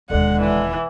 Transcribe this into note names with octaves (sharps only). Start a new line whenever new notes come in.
E1 D#2 D3 G#3 F#5
E3